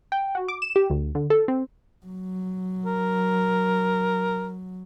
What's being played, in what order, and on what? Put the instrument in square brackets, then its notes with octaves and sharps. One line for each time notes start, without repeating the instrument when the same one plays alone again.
[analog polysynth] G5
F#4
D6
E7
G4
D2
D3
A4
C4
[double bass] F#3
[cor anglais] A#4